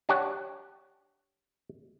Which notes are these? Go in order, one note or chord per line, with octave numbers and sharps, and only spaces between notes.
D4 G4 C#5 F#5